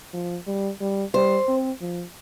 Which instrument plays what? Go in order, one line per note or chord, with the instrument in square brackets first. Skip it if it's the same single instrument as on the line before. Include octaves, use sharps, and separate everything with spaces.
[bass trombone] F3
G3
G3
[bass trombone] G3 [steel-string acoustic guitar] C5
[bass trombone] C4
F3